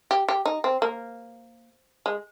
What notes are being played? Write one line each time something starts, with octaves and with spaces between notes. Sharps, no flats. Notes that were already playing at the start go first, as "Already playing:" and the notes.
G4
G4
D#4
C4
A#3
G#3